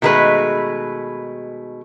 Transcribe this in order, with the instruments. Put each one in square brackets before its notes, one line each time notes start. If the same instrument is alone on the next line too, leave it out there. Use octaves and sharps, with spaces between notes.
[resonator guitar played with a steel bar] B2 D#3 G#3 A3 B4